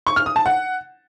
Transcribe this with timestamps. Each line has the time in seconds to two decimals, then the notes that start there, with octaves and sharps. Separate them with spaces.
0.07 C#6
0.16 F6
0.26 D#6
0.36 A5
0.46 F#5